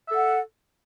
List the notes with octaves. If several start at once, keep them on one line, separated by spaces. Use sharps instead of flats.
A4 E5 F#5